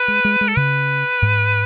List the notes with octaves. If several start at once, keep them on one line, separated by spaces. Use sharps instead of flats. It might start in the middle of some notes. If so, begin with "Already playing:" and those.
Already playing: B4
G#3
G#3
G#3
A4
C#3 B4
G#2